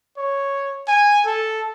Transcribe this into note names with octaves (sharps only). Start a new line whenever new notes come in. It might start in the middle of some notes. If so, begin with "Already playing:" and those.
C#5
G#5
A4